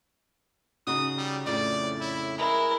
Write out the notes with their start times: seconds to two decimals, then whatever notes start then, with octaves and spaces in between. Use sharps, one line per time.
0.87 C#3 D#4 F#4 D#6
1.17 G3
1.46 F2 A2 C#3 D5
2.01 E4
2.38 G#3 E4 A#4